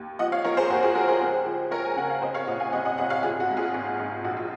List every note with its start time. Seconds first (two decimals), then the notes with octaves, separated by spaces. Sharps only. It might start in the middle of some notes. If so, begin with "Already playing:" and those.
Already playing: D#2
0.19 F3 D#5 F#5
0.32 C#5 F5
0.44 F3 A#4 C#5
0.57 G#4 C5
0.70 D#2 F#4 A#4
0.83 F4 G#4
0.95 F3 F#4 A#4
1.08 G#4 C5
1.21 C#2
1.46 F3
1.71 F3 A#4 C#5
1.85 G#5
1.96 C#3 F#5
2.10 F5
2.22 C2 C5 D#5
2.34 C#5 F5
2.47 A#2 D#5 F#5
2.60 F5 G#5
2.72 C2 D#5 F#5
2.85 D#5 F#5
2.98 C2 D#5 F#5
3.10 C#5 F5
3.23 G#1 F4 G#4
3.40 F#4
3.49 G#2
3.57 F4 G#4
3.74 G#1
3.99 G#1
4.24 A#1 F#4
4.37 F4